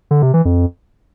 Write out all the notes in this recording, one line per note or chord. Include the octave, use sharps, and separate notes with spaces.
D3
C3
E3
F2